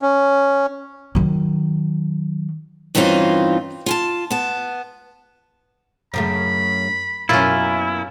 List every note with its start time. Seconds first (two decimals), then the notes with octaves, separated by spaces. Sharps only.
0.02 C#4
1.15 D#3 F#3
2.95 G2 E3 C4 C#4 D#4 F4
3.86 F4 G#5 A5
4.31 B3 A5
6.14 F#2 C#3 A3 B5
7.29 F#2 B2 A#3 C#4 E4 F4